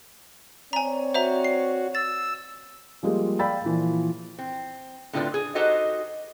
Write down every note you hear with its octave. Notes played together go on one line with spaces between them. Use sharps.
C4 C#5 D5 G#5 A#5
F#4 C5 E5 A#5
C7
E6 A6
F3 G3 G#3 A#3 G4
D5 F5 G5 B5 E6 A6
A#2 E3 F3
C4
A2 D3 C4 F4 B4 D5
G#4
D#4 F#4 G4 A4 C5 D#5